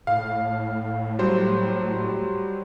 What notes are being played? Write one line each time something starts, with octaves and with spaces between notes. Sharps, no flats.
A2 F5
F#3 G3 C5